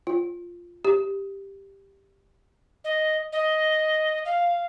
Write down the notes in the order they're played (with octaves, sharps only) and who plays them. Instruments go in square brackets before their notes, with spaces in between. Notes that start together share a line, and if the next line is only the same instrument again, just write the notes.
[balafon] F4
G4
[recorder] D#5
D#5
F5